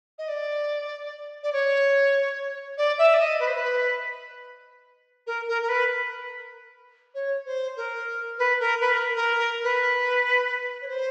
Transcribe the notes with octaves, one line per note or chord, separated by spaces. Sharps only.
D#5
D5
D5
C#5
D5
E5
D5
D#5
B4
C5
B4
A#4
A#4
A#4
B4
C#5
C5
A#4
B4
A#4
B4
A#4
A#4
B4
C#5
C5